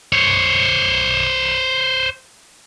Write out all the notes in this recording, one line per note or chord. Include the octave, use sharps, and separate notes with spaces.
C5 C#5